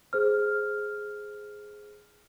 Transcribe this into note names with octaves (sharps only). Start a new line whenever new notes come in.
G#4 C5 F6